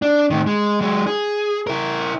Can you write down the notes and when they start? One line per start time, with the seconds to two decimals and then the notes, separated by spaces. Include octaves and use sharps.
0.02 D4
0.31 A2 D#3
0.47 G#3
0.80 F#3 G#3
1.07 G#4
1.67 E4 A#4